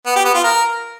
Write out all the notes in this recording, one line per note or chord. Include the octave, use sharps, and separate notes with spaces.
B3
G4
B3
F4
A#4